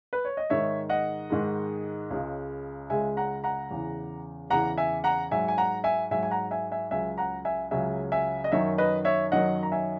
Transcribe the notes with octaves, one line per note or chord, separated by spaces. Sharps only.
B4
C#5
D#5
G#2 D#3 G#3 C#5 E5
D#5 F#5
G#2 D#3 G#3
C#2 C#3 G#3
C#2 C#3 G#3 E5 G#5
F#5 A#5
F#5 A#5
E2 C#3 E3
E2 C#3 E3 F#5 A#5
E5 G#5
F#5 A#5
G#2 F#3 E5 G#5
G#5
F#5 A#5
E5 G#5
G#2 F#3 E5 G#5
G#5
F#5 A#5
E5 G#5
E5 G#5
C#2 C#3 F#3 E5 G#5
F#5 A#5
E5 G#5
C#2 C#3 F#3 E5 G#5
E5 G#5
D#5
F#2 D#3 F#3 C#5 E5
B4 D#5
C#5 E5
F#2 D#3 F#3 D#5 F#5
A#5
E5 G#5